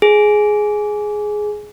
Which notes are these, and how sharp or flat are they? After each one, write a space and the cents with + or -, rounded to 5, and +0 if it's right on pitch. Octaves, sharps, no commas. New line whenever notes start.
G#4 +10